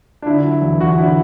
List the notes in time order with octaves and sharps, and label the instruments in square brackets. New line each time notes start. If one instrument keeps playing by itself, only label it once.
[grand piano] D4
D3 E4
F#3
E2
E1 F#4
D3 E4